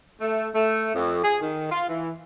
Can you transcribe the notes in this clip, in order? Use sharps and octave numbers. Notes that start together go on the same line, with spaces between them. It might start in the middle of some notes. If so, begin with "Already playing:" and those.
A3
A3
F2
G#4
D#3
F4
E3